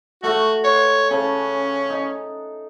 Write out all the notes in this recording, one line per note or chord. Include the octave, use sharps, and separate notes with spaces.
A3 F#4 F#5
C#5
C#3 C#4 A5
D#4